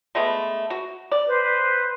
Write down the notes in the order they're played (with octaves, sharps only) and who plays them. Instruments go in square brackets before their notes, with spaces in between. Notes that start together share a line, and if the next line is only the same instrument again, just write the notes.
[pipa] G#3 A3 B3
F#4
D5
[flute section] B4 C5